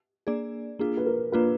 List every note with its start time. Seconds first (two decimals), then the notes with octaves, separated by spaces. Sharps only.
0.27 A#3 D4 G#4 D5
0.79 A#3 D4 F4 G#4
0.97 B4
1.06 A#4
1.32 A#3 D4 F4 B4